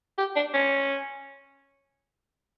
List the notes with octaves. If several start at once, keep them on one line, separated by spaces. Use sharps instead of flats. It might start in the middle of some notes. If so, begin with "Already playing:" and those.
G4
D4
C#4